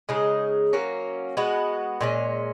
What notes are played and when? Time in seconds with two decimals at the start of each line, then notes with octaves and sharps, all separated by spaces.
0.09 C#3 G#3 D#4 G#4
0.73 F#3 A#3 C#4
1.37 G#3 B3 F#4
2.01 A#2 G#3 C#4